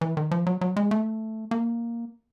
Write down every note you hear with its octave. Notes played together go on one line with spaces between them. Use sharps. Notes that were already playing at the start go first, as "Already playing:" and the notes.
E3
D#3
F3
F#3
F#3
G#3
A3
A#3